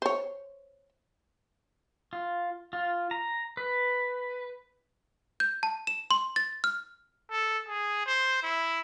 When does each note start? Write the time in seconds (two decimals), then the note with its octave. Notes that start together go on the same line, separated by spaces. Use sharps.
0.02 C5 C#5
2.13 F4
2.73 F4
3.11 A#5
3.57 B4
5.40 G6
5.63 A5
5.87 E7
6.11 C6
6.36 A6
6.64 F6
7.31 A4
7.68 G#4
8.06 C5
8.43 E4